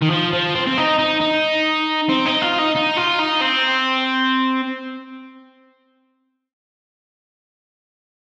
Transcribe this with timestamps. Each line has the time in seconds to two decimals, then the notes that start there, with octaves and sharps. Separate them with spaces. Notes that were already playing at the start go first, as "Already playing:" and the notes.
0.02 D#3
0.11 F3
0.33 F3
0.55 C4
0.67 C4
0.78 D#4
0.99 D#4
1.21 D#4
2.09 C4
2.26 D#4
2.42 F4
2.59 D#4
2.76 D#4
2.97 F4
3.19 D#4
3.41 C4